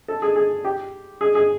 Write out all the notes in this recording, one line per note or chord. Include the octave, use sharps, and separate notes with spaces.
A4
G#4
G#4
G4
G#4
G#4